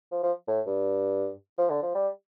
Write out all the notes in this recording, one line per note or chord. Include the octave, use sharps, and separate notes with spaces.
F3
F3
A2
G2
F3
D3
F3
G3